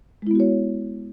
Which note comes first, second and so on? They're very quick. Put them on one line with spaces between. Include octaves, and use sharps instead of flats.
G#3 E4 B3 F#4 C#5